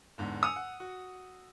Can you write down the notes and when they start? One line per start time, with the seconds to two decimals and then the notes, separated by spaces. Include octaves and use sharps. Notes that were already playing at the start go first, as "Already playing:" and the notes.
0.18 E2 G#2 D3
0.42 G#5 D#6 E6 C#7 D#7 F7
0.56 F#5
0.80 F#4